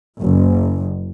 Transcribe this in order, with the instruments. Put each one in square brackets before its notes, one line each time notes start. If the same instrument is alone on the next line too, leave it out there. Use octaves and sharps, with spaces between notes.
[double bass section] F#1